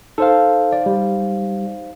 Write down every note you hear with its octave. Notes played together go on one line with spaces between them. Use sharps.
D#4 A4 C5 F5
D5
G3